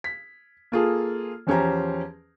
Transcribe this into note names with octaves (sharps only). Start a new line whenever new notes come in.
B6
A#3 F4 G#4 A4
E2 F3 C#4 G4 C5 A#5